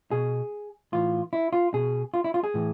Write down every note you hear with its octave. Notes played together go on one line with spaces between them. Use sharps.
B2 G#4
A2 E3 F4
E4
F4
B2 G#4
F4
E4
F4
G#4
A2 E3